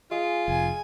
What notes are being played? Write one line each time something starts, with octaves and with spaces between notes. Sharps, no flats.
G#3 F4
F1 G#5